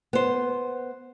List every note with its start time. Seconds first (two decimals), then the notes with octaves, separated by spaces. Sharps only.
0.13 B3 C5